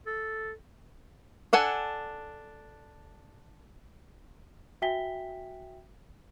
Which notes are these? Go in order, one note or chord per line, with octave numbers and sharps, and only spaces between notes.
A4
D4 A4 F#5 G#5
F#4 E5 G5 G#5 B6 G7